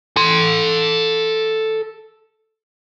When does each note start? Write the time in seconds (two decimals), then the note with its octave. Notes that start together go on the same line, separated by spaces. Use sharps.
0.17 A4 C6